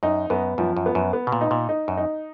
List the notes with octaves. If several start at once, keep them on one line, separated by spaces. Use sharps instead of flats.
F#2 D#4
F#2 B3
F#2 F3
F#2
B3
F#2
B3
B2
A#2
D#4
A#2
D#4
F#2
D#4